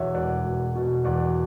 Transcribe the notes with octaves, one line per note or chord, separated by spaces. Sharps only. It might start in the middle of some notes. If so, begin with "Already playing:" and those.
Already playing: E1 E2 B2 C#5 D5 E5 F#5
E1 D5 F#5
E1
B2
E2 D5 F#5